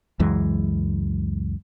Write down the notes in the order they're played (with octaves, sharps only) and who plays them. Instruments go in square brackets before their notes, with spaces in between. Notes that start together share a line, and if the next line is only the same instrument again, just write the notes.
[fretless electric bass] C#2 F#2 E3 G#3